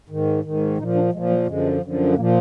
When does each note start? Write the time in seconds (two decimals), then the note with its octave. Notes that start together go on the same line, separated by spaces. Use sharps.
0.09 G#2 D#3
0.44 G#2 D#3
0.78 A#2 D#4
0.81 F3
0.95 D4
1.13 A#2 F3 G#3
1.30 F#3
1.46 F#2 D3 F3 G#3
1.82 F#2 D3 F3
2.16 A#2 F3 A#3